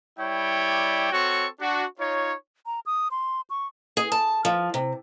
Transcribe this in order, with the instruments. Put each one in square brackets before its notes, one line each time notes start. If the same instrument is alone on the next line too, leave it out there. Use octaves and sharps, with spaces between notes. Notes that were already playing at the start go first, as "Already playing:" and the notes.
[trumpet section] G3 E4 C#5 D5 G5
C4 F#4 A4 C#5 C#6
D4 F#4
D#4 F4 C#5
[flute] A#5
D#6
C6
C#6
[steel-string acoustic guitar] G#4
A5
F3
C3